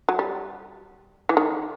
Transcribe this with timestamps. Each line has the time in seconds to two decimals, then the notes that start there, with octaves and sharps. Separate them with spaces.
0.09 F#3
0.19 G3
1.29 E3
1.37 D#3